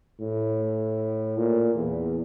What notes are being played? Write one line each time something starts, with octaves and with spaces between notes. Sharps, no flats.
A2
A#2
E2